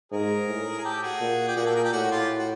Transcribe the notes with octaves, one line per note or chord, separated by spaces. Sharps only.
G#2 G#4 A#4
A2
G#4
G4 A4
F#4 G#4
A#2
G4
A#2 F#4 G#4
G4 A4
G#4 A#4
G4 A4
A2 F#4 G#4
F4 G4
F#4